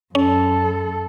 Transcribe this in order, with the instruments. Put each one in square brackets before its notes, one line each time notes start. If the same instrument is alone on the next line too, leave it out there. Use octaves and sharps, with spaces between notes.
[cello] F#2 A4 [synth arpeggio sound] C#4